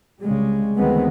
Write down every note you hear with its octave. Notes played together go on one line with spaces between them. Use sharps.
C2 C#3 G3 G#3
D2 D#3 E3 G#3 B3 C4